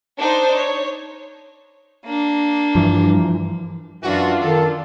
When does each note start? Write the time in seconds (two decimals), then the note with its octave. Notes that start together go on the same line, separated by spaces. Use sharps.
0.17 D4 D#4 C5
0.56 C#5
2.05 A#3 D4
2.75 G2 E3 F3
4.03 F#2 E3 D4 F4 F#4
4.42 D#3 A4